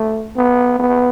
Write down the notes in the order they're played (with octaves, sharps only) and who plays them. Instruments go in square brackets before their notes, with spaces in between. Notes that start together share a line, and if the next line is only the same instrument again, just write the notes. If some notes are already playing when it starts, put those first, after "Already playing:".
Already playing: [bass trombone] A3
B3
B3